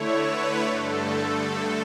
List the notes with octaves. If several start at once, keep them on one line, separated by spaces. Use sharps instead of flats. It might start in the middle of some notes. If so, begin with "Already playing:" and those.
Already playing: D3 A3 E4 C#5
B4
G2 D3 A3 A4
A4